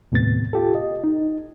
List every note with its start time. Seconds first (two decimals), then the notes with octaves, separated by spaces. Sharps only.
0.12 D#2 A2 C3 B3 A6
0.53 F4 G4 A4
0.75 D#5
1.04 D#4